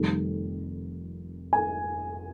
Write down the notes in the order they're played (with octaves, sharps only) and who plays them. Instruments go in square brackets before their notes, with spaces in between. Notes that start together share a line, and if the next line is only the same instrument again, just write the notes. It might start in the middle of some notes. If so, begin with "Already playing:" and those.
Already playing: [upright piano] F1 F2 D#3 G3
G#5